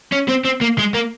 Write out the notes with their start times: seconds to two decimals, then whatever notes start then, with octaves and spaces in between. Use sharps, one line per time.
0.13 C#4
0.29 C4
0.45 C4
0.61 A#3
0.78 G#3
0.94 A#3